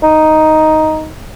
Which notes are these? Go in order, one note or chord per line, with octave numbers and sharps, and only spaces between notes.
D#4